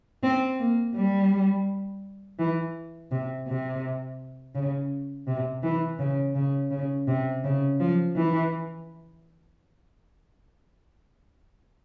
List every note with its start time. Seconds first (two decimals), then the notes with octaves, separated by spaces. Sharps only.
0.23 C4
0.59 A#3
0.95 G3
2.39 E3
3.12 C3
3.48 C3
4.55 C#3
5.27 C3
5.63 E3
5.99 C#3
6.35 C#3
6.71 C#3
7.08 C3
7.44 C#3
7.80 F3
8.16 E3